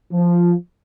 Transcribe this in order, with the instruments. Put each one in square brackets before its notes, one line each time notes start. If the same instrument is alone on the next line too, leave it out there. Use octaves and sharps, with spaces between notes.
[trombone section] F3